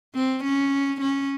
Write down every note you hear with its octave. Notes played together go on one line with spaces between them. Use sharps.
C4
C#4
C#4